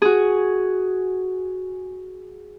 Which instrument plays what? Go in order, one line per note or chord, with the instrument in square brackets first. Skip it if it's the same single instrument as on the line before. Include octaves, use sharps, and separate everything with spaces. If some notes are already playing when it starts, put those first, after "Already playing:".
[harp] F#4 G#4